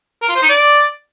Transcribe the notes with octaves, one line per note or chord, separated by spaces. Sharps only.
A#4
F4
C5
D#4
D5